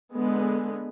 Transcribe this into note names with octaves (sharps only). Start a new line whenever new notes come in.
D3 G#3 B3